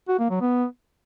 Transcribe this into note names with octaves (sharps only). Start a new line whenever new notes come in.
F#4
A#3
F#3
B3